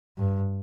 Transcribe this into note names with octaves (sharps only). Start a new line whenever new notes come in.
G2